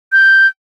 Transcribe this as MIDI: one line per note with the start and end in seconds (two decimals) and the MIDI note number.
0.12 0.47 91